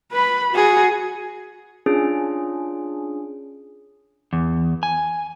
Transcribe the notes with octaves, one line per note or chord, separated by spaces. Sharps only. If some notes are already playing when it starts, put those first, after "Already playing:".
B4 B5
F#4 G#4
C#4 D4 F4 G#4
E2
G#5